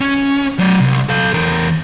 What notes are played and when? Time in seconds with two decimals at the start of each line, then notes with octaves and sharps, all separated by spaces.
0.01 C#4
0.59 F#3 D5
0.80 C2
1.09 A4 F5
1.34 E2 A#4